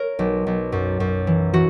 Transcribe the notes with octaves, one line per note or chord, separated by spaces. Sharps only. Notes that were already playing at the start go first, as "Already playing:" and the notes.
Already playing: A#4 C#5
B1
B1
F#2
F#2
E3
E3 F#4